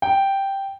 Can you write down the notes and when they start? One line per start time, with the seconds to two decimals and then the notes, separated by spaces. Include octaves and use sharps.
0.02 G5